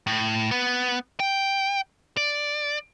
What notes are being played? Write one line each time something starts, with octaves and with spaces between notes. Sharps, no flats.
A2
B3
G5
D5